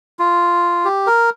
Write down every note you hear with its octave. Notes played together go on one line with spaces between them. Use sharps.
F4
G4
A#4